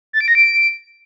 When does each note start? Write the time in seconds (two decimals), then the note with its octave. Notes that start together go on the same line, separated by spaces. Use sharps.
0.13 A6
0.21 D7
0.28 A#6
0.35 D7